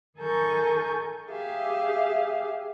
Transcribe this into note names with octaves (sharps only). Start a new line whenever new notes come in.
D#3 A4 A#4 G#5 C#6 G6
G4 G#4 E5 F5